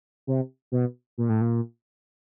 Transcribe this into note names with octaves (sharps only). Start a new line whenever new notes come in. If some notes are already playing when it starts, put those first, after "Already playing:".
C3
B2
A#2
A2
A#2